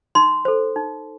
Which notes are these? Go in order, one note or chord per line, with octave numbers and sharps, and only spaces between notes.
D#4 C6
A4 C5
D#4